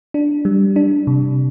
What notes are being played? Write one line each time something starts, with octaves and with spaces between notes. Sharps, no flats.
D4
G3
D4
C3